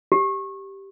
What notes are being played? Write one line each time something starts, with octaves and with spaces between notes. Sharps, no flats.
G4